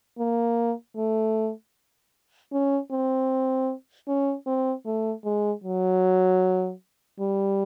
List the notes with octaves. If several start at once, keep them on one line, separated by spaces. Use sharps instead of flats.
A#3
A3
C#4
C4
C#4
C4
A3
G#3
F#3
G3